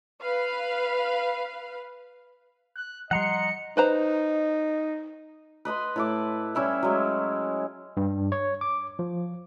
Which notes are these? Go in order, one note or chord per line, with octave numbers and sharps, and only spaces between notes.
B4 F5
F#6
F3 G3 D#5 F#5 A#5 C6 C#7
D#4 B4 C5 A#5
B4 D#5 B5 C6
A2 E4 D6
G3 C#4 E4 E5
F#3 G#3
G2
C#5
D6
F3